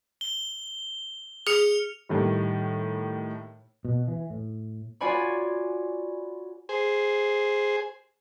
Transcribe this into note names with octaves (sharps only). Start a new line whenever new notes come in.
G7
G#4 F6 C#7 F7
A2 D#3 G3
B2
E3
A2
F4 F#4 C#5 D5 G#5 B5
G#4 C5